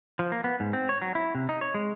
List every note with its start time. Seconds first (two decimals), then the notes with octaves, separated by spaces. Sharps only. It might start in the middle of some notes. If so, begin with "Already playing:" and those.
0.19 F3
0.32 A#3
0.44 B3
0.60 G#2
0.73 C4
0.89 C#5
1.02 F#3
1.15 E4
1.35 C3
1.49 D#4
1.61 C#5
1.74 G#3